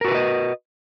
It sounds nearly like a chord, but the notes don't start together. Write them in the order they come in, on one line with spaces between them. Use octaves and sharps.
A#4 F#4 B4 E4 D#5